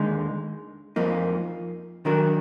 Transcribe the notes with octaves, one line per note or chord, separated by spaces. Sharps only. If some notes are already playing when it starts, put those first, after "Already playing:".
Already playing: D#2 D3 G#3 D#4
F2 F3 A#3 D#4
D#3 F#3 D4 F#4 A#4